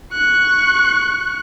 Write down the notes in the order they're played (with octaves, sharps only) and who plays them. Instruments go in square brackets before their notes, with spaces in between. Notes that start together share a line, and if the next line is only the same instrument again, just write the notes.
[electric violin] C#6 F#6